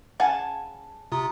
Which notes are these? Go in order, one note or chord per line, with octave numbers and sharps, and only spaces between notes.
C#3 F5 F#5 G#5 A5
C3 F4 A#5 D#6